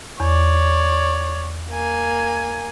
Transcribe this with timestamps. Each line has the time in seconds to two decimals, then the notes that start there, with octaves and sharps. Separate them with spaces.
0.20 E2 C#5 D5
1.70 A#3 G#5